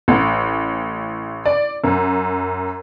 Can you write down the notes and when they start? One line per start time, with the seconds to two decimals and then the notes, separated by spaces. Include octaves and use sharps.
0.08 A1
1.46 D5
1.84 F#2